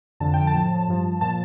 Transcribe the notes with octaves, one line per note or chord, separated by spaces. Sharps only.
F2 D3 F3 A5
G5
A5
A2 F3
G2 F3
A#2 F3 A5